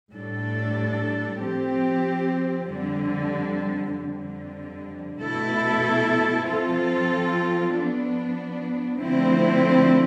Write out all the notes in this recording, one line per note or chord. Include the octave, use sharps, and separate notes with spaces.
A2 G3 D4 A4
F3 C4 G4
F2 D3 G3
F2 D3 G3
B2 A3 E4 A4
F3 C4 F4 A4
F3 B3 D4
D3 F3 A3 C4 E4